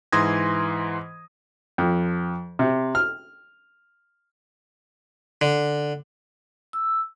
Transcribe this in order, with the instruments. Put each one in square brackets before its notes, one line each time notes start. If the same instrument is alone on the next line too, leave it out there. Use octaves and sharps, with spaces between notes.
[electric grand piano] G#2 E3 C6 D#6 G#6 A#6
[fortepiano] F2
C3
F6
[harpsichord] D3
[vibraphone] E6